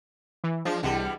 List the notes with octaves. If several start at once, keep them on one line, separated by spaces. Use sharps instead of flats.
E3
F3 G#3 D4
C2 B2 E3 G3